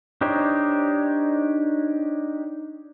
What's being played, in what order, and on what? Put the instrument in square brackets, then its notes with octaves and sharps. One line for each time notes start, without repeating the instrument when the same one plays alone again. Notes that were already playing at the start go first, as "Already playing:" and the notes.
[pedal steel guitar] D4 D#4 G4 C5 C#5